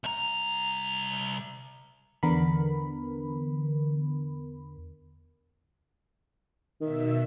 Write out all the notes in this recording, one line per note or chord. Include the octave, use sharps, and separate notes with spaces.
C2 A#5
E2 D3 B3 A#4 B5
B2 D#3 E5